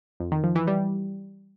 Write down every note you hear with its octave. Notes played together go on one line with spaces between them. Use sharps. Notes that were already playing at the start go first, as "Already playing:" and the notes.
F2
D#3
F3
E3
G3